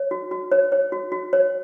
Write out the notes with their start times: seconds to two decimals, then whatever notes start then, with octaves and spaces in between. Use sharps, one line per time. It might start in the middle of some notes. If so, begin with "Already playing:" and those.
Already playing: C#5
0.11 F#4
0.31 F#4
0.52 C#5
0.72 C#5
0.92 F#4
1.12 F#4
1.33 C#5